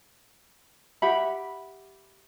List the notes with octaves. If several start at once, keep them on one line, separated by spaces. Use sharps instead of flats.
G4 E5 F#5 B5